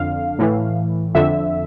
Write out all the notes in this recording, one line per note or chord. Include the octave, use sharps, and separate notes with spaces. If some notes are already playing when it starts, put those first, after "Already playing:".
Already playing: F2 D3 F5
A2 E3
F2 D3 E5